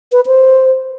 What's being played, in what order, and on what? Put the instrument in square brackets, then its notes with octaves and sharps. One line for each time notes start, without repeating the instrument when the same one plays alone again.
[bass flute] B4
C5